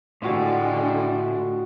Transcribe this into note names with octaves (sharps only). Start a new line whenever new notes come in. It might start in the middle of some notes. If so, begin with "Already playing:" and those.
A2 D3 G3 G#3 F4 F#4 F#5